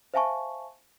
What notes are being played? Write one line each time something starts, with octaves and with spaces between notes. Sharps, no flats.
C5 E5 F5 G#5 A5 C#6